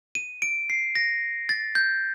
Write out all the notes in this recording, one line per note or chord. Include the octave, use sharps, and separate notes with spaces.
D#7
D7
C7
A#6
A6
G6